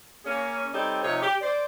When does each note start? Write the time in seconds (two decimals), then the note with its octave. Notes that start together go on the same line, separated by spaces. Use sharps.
0.25 A#3 C#4 G#4
0.73 G3 C4 D#4 G4 A4 C#5
1.03 C3 F3 D#4 C#5
1.22 G4
1.41 C5 D5